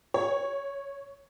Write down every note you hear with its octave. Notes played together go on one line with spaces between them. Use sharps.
C#5